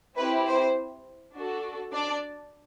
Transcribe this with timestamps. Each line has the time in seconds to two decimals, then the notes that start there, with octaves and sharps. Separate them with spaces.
0.17 C4 E4 G4 B4
0.46 C5
1.35 D4 F#4 A4
1.93 D4 D5